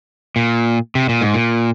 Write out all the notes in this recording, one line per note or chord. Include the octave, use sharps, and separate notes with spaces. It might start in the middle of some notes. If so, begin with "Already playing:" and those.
A#2
C3
A#2
G#2
A#2